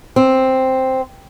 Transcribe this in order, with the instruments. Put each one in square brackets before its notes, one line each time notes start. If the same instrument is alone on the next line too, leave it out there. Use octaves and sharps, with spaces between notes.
[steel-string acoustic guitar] C4